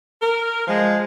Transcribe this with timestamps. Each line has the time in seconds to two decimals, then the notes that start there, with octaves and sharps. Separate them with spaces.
0.22 A#4
0.68 F3 G#3